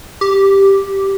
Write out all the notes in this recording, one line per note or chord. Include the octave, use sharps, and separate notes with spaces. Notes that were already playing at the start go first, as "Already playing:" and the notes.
G4